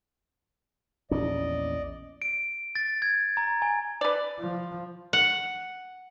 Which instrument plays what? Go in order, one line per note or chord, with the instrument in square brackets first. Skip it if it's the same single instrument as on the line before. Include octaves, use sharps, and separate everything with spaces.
[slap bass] A#1 E2 C#4 [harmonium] D5 D#5
[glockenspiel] D7
A6
G#6
A#5
G#5
[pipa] B4 D5
[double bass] F3
[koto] F#5